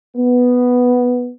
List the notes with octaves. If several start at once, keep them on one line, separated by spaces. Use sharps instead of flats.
B3